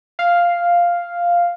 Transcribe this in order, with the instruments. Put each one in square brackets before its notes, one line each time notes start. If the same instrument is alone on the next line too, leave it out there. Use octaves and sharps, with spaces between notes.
[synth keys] F5